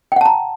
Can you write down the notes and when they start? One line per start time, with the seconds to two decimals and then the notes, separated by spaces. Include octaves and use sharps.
0.12 G5
0.16 F#5
0.21 A5
0.26 A#5